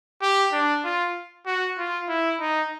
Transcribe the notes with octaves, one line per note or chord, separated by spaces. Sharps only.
G4
D4
F4
F#4
F4
E4
D#4